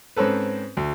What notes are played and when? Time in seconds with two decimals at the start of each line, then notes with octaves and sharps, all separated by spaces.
0.16 G#2 C4 C#4 A4 B4
0.77 D2